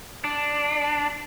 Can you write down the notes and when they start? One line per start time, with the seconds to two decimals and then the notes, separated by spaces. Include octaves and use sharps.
0.24 D4